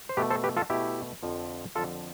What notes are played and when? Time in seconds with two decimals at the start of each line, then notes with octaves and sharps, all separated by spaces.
0.09 C5
0.17 B2 A3 G4 B4
0.30 A4 C5
0.44 G4 B4
0.57 F4 A4
0.70 B2 A3 E4 G4
1.23 F2 D3 F3
1.75 F2 D3 F3 F4 A4